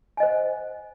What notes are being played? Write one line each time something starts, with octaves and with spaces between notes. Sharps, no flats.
C5 D#5 F#5 G#5